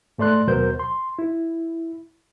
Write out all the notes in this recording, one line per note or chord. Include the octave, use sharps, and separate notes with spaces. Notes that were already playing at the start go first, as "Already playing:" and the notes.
G#2 A3 D5 C6 F#6
D#2 B2 F#3 A#4 C5 G6
C6
E4